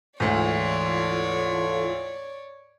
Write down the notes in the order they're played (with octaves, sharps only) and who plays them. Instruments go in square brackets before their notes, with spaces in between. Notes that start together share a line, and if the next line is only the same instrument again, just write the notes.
[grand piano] D2 G#2 [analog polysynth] E3 F4 A4 [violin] C#5 D5